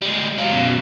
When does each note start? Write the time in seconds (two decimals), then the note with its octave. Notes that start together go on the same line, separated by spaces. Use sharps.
0.02 G3 G#3
0.38 F#3 F4
0.53 F#2 B2